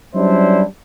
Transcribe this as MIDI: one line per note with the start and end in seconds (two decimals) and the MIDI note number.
0.15 0.62 54
0.15 0.62 55
0.15 0.62 61
0.15 0.62 62
0.15 0.62 64
0.15 0.62 72